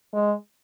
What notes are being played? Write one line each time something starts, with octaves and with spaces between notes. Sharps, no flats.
G#3